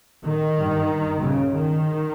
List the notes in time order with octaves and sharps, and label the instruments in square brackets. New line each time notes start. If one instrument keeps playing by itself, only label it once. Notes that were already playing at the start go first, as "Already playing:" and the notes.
[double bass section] D#3
G2
C#3
D#3